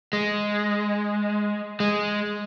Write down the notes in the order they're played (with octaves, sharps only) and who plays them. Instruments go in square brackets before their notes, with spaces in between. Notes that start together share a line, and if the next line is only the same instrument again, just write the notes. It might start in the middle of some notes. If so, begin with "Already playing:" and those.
[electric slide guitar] G#3
G#3